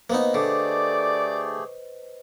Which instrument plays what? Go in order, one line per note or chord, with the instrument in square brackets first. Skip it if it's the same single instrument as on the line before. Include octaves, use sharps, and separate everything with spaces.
[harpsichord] A#3 B3 D#4 [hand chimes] B4 C5 D#5
[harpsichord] D3 [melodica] A3 G4 G#4 [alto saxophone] D5